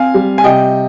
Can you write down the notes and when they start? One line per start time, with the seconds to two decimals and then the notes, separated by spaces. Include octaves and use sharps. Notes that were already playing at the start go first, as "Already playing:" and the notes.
Already playing: C4 F5 G#5
0.14 G3
0.38 G#5
0.44 C3 D#5 G5